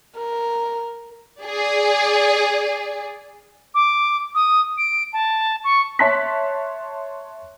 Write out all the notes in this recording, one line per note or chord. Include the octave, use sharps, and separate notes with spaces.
A#4
G#4 D5
D6
D#6
D7
A5
C#6
C#5 E5 A5 C6 F#6 B6